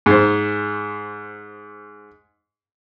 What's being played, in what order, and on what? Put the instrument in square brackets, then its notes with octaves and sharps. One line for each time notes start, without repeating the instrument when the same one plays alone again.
[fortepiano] G#2 C5